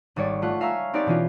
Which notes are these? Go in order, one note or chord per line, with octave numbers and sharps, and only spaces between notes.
G#1 G3 C#5 D5
A3 F4 F#5 C#6
E5 F5 G#5 A#5 C#6 E6
B3 C4 D#4 G4 C#5 D5
B2 E3 C#4 F4